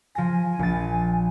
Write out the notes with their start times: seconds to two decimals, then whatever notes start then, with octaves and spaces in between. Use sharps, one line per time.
0.15 F3 G#5 A#6
0.59 A#1 A6